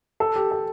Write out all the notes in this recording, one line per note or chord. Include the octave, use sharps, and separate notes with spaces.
A4
G4
A4